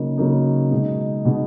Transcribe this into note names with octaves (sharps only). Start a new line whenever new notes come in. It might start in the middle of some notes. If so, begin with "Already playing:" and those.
Already playing: C#3 F#3 A#3 D#4
C#3 F#3 A#3 D#4
B2 G#3 D#4
B2 G#3 D#4